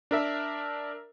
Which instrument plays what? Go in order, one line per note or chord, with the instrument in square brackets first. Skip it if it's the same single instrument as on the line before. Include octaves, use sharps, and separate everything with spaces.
[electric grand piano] D4 A#4 E5